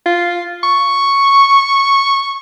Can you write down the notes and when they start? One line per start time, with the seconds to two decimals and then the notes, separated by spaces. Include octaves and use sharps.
0.06 F4
0.63 C#6